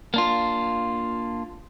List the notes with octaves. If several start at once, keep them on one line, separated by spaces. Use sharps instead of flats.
A#3 D4 F4